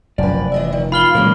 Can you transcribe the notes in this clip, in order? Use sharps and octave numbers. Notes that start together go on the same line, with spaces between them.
F1 F#2 F3 B4 D5
E3 D#5 E5
D#3
F4 B5 F6 G7
A#2 E3 F#3 G#3 A#3 C#4